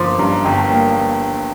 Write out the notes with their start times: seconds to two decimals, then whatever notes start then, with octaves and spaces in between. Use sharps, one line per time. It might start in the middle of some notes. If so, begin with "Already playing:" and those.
Already playing: G1 F3 A#3 C6 D6
0.19 G2 A#5
0.44 G1 G5
0.57 A5
0.70 A#3 G5